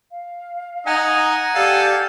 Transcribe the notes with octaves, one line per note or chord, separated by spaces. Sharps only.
F5
D#4 D#5 F#5 G#5
G4 A4 D5 F5 G5